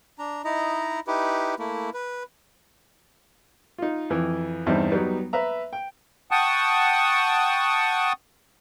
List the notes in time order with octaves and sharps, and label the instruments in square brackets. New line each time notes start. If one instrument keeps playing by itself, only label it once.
[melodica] D4 A#5
D#4 E4 D#5 A#5
D#4 E4 G4 B4
A3 A#3 E4
B4
[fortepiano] D#4 F4
F2 E3
E2 G2 C4 D#4 E4
F#3 G3 B3 D#4
B4 E5 A#5
G5
[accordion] F#5 G5 A5 C#6 D#6